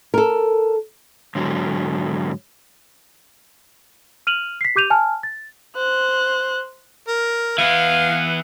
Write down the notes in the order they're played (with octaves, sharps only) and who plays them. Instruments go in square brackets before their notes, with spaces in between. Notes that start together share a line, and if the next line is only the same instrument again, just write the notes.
[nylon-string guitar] A4 A#4
[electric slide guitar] G#2 D3 F#3
[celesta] F6 D#7 F7 F#7
B6 C7
G4 D6 G6 D#7 F7
G#5 A5 F6
A6
[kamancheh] C5 F#6
[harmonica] A#4
[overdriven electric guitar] E3 B3 [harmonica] F5